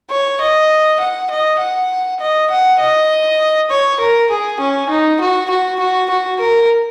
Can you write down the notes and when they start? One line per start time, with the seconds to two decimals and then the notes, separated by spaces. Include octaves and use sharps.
0.10 C#5
0.40 D#5
1.00 F#5
1.30 D#5
1.60 F#5
2.20 D#5
2.50 F#5
2.79 D#5
3.70 C#5
3.99 A#4
4.30 G#4
4.60 C#4
4.89 D#4
5.20 F#4
5.49 F#4
5.79 F#4
6.10 F#4
6.40 A#4